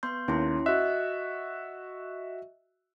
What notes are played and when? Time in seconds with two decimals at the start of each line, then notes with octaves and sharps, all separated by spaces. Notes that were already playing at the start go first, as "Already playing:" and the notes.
0.03 B3 C6 G6
0.28 D#2 C#4 E4 C6
0.66 F#4 D#5 E5 F#6